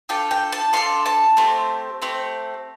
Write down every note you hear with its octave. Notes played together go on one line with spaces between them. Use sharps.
D4 F4 A4 G5
G5
A5
D4 F4 A4 C6
A5
A3 C4 G4
A3 C4 G4